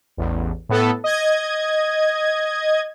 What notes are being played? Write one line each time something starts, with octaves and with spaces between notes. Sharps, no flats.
A1 E2
A2 B3 A4
D#5 G#6